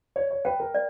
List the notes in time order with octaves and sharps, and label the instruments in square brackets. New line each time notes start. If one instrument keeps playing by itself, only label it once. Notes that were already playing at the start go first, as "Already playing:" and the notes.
[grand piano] C#5 [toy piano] D5
[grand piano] C#5
[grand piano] B4 [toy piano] G5
[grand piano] A#4
[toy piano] D5